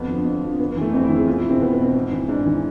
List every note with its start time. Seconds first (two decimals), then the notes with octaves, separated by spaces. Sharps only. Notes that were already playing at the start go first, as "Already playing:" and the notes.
Already playing: F2 B3
0.08 D3 F3
0.25 F2
0.42 D3 F3
0.59 F2 B3
0.71 B3
0.77 E3 A3
0.93 F2 C4
1.04 E4
1.10 E3
1.16 G#4
1.27 E2 F4
1.38 E4
1.44 B2
1.50 C4
1.61 E2 B3
1.73 B3
1.78 B2
1.84 C4
1.95 G#2
2.12 E3
2.28 G#2 D4
2.46 E3